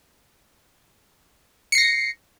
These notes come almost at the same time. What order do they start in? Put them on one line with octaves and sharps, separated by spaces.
C#7 C7 A#6